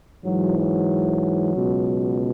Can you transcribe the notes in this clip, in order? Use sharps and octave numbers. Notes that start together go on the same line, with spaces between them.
G#2 E3 F#3
F#3
C#2 B2